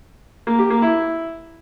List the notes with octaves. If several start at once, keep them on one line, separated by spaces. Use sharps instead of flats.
A#3
G4
A#3
E4